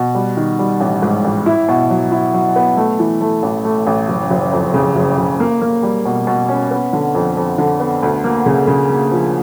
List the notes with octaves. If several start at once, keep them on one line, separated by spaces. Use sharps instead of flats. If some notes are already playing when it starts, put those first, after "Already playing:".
Already playing: B2
G3
D#3
G3
A1
G#2
A1
E4
B2
F#3
E4
F#3
B3
A3
E3
A3
A1
A3
A1
F#1
F#1
F2
C#3
F#1
F#1
A#3
A#3
G3
B2
B2
C#4
B3
D3
F2
F2
D3
B3
D2
A#3
C#3
C#3
A#3
F3